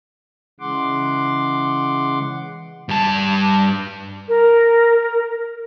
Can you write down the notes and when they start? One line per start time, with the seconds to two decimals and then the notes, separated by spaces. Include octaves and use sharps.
0.60 C#3 E3 G#3 F#5 C6 D6
2.89 G2 A5
4.28 A#4